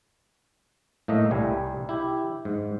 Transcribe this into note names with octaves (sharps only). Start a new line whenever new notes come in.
A2 A3 A#3 D#5 E5
C2 G3 G#5
E4 G4
G#2